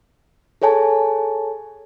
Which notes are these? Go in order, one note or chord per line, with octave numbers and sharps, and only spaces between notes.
G#4 A4 C#5 G#5 A5